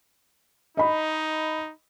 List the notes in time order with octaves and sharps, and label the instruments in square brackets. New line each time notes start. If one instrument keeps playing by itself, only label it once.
[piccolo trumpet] D#4 [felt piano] D#5 B5